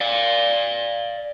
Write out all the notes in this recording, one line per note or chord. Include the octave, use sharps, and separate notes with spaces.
D5 F5